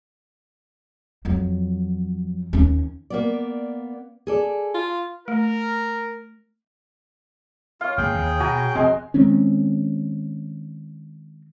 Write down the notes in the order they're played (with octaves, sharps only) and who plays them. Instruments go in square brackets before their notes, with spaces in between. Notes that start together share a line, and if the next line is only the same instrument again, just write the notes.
[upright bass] F2 F#3
D#2 C#4
[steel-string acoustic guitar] A#3 B3 D5
G#4 A4 D5
[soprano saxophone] F4
[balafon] A3 [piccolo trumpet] A#4
[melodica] F4 [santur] C#5 F5
[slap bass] G1 A#3 [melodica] G#4 G5
[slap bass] D#2
[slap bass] B2 [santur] F#4 G#5 A#5
[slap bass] F1 C4 [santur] G#3 G#5 C6
[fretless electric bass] D#3 G#3 C4 C#4